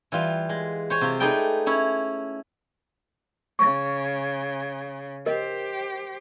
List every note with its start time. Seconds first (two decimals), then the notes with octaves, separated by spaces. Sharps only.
0.12 E3 G3 F4
0.49 G#3
0.90 C5 C#5 G#5
1.01 C3 F4
1.20 A3 D#4 G#4 B4 D5 G5
1.66 C#4 E4 C#5
3.59 C#3 C#6
5.26 G4 A#4 C5 D#5